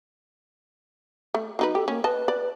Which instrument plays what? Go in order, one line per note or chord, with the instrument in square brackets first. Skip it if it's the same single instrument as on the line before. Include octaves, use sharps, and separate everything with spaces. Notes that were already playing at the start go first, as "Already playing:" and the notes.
[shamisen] A3
F#3 D#4 B4
[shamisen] G4 [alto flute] A4
[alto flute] A#3 [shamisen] C#4
[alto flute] B4 [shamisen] D#5 A5
[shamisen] D5